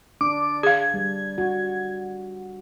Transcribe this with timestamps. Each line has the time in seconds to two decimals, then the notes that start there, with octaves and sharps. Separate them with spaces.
0.21 D4 D6
0.63 G#4 F5 G#6
0.94 G3
1.38 F#4